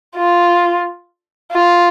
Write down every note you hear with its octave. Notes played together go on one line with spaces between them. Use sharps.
F4
F4